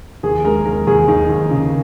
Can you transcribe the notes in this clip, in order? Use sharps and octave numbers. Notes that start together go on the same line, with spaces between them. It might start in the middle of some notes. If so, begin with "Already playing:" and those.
D#2 G#4
G#3 A#4
D#2 A#4
D#2 G#4
D#2 D#4
D#2
C#3